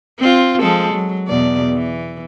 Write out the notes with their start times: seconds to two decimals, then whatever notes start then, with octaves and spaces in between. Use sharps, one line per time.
0.19 C4 F4
0.62 F3 G#3 A4
0.94 F#3
1.28 E2 B2 D5
1.73 E3